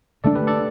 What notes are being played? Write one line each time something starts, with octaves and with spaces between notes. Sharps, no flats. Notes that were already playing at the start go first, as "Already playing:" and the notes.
D3 A3 D4 A4 D5
G4 B4
A4 D5